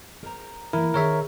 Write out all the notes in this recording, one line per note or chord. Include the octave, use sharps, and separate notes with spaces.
A#4 C5 A#5
E3 A#3 E4 A#4
D#3 D#4 G#4 A#4 C#5 E5